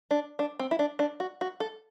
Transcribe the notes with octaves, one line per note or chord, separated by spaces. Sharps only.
D4
D4
C4
E4
D4
D4
F#4
F#4
A4